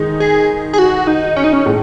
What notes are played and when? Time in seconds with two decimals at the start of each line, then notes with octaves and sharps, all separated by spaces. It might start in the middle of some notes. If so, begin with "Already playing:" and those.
Already playing: D#3 G#3 D#4
0.20 G#4
0.73 G#4
0.79 F#4
1.07 D#4
1.36 C#4
1.44 D#4
1.53 C#4
1.66 A2 G#3